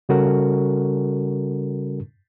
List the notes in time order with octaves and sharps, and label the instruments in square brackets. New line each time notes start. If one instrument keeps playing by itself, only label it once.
[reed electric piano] C#3 G3 C#4 F#4 A4 A#4